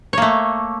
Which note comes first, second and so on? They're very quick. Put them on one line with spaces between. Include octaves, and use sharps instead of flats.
C#5 A#3 A3